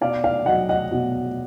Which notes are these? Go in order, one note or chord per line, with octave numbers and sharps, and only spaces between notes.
B2 D5 F5
D5 F5
F#3 D#5 F#5
D#5 F#5
B2